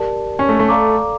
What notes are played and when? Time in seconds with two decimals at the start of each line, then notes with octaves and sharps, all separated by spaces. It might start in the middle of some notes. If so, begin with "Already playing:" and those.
Already playing: G4 A#4 D5 A5
0.39 C#4
0.49 A3
0.59 A3
0.69 A4 D5 F5 A#5 D6